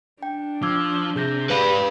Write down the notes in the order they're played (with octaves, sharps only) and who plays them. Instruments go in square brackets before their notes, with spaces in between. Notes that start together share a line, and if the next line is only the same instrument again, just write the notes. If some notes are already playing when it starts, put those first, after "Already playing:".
[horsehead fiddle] D4 [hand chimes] G5
[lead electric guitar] F3 [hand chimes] D6 E6 G#6
[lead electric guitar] C3 [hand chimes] G#4 G6 A#6
[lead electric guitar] G#2 D5 [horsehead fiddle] G4 B5 [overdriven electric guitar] B4 F5